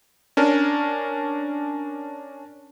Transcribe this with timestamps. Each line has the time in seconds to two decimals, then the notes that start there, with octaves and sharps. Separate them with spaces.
0.37 C#4 D4 A#4